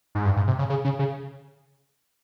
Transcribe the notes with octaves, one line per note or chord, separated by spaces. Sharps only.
G#2
G2
G#2
C3
C#3
C#3
C#3
C#3